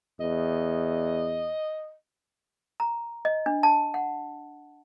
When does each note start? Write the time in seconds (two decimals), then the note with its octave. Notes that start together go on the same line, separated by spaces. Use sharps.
0.20 E2 D#5
2.80 A#5
3.25 D#5
3.46 D4
3.63 A5
3.94 F#5